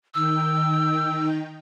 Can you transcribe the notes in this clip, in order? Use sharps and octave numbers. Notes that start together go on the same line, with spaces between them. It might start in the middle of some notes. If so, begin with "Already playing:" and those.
D#3 D#4 G5 E6